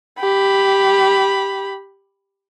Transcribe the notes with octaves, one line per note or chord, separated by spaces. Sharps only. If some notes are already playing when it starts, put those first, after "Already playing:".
G4 B5